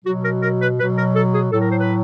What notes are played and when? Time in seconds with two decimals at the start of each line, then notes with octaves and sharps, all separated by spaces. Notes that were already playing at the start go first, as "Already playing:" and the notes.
0.05 B2 F#3 F#4
0.23 A#4
0.42 A#4
0.60 B4
0.78 F#3 B4
0.82 B2
0.97 A#4
1.15 A4
1.34 G#4
1.52 A2 F#3 A4
1.61 A#4
1.71 C5
1.80 B4